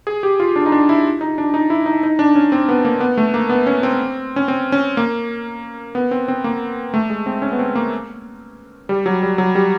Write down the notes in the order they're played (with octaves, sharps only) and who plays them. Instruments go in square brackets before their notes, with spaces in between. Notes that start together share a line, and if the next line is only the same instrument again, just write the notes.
[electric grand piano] G#4
G4
F4
D4
D#4
D4
E4
D#4
D4
D#4
E4
D#4
D#4
D4
C#4
C4
B3
A#3
B3
A3
A#3
B3
C#4
C4
C#4
C4
C#4
A#3
B3
C4
C4
A#3
A3
G#3
C4
C#4
B3
C4
A#3
G3
F#3
G3
F#3
G3